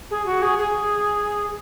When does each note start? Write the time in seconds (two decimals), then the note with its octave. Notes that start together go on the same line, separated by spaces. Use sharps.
0.10 G#4
0.25 F#4
0.42 G#4
0.58 G#4